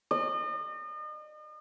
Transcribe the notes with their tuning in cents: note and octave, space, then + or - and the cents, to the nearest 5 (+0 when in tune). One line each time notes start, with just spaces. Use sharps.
D#5 -40